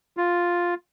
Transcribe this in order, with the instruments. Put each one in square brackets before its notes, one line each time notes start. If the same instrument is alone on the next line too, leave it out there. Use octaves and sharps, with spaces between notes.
[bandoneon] F4